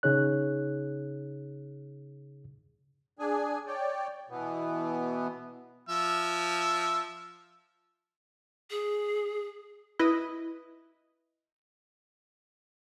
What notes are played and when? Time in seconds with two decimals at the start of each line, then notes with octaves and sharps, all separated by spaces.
0.03 C#3 D#4 G#4 C#5 F#6
3.19 D4 G#4 G#5
3.67 C#5 D5 G5
4.30 B2 E3 B3
5.89 F3 E5
8.71 G#4
9.99 E4 B4 D#5